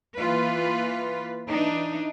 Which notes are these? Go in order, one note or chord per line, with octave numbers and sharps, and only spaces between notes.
E3 A#3 F4 B4
E3 D4 D#4